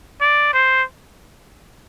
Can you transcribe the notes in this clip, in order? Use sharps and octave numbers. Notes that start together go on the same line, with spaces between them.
D5
C5